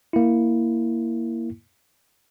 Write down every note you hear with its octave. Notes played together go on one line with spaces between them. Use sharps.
A#3 E4